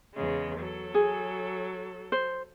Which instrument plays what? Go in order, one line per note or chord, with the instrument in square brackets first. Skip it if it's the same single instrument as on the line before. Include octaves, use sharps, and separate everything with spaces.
[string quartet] E2 C#3 G#3
F#3 A4
[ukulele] G#4
C5